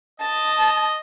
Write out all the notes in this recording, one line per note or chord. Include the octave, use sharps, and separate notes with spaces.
D#5 A5